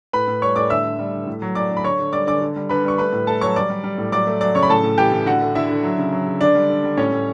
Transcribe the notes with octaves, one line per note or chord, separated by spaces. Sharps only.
A2 B4 B5
A2
G3 C#5 C#6
A2 D5 D6
D3 E5 E6
D3
G3
D3
A2
F#3
A2 D5 D6
A2
B5
D3 C#5 C#6
D3
G3 D5 D6
D3 D5 D6
D3
G3
D3 B4 B5
G3 C#6
A3 B4 B5
A2
A3 A4 A5
F#3 C#5 C#6
G3 D5 D6
G3
G3
A2
F#3 D5 D6
A3
F#3 D5 D6
C#3 C#5 C#6
B5
A2 A4 A5
A2
E3 G4 G5
A2
D3 F#4 F#5
A3
D3 E4 E5
D3
F#3
C#3
F#3
C#3
D3 D4 D5
G3
D3
G3
A2 C#4 C#5
A2